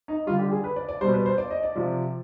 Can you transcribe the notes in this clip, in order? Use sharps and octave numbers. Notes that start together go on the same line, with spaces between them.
D#4
D3 G3 F4
G4
G#4
B4
D5
D5
B2 G3 C5
B4
C5
D5
D#5
D5
C3 F3